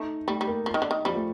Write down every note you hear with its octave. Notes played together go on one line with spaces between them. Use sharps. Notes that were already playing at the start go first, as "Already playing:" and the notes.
Already playing: A3 D#4
G3 A3
G3
A#3
F3
D#3
D3
D#3
F3 G3
A3